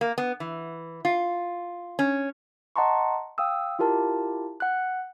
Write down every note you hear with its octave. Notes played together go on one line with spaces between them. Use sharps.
A#3
B3
E3
F4
C#4
D#5 F#5 A5 A#5 C6 C#6
F5 G5 D#6 E6
E4 F4 G4 A#4 A5
F#5 F#6